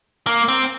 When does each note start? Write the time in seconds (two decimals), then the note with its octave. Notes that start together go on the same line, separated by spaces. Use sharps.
0.27 A#3
0.48 C4